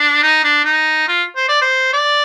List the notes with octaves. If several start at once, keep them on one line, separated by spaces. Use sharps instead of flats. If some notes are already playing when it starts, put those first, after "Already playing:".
Already playing: D4
D#4
D4
D#4
F4
C5
D5
C5
D5